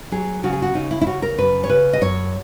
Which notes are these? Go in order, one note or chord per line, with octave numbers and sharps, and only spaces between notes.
F#3 G#4
C#3 F#4
G#4
F#4
C#3 D#4
E4
E4
C#3 F#4
A#4
F#2 B4
C#5
C#3 B4
D#5
F#2 C#5